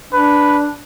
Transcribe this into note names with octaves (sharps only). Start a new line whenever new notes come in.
D4 B4